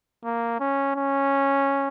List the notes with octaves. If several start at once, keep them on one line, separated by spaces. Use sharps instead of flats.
A#3
C#4
C#4